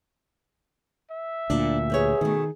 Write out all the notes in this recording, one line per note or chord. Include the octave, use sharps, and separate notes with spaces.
E5
D2 A#2 D4
G4 G#4 B4 C#5
B2 D#3 A3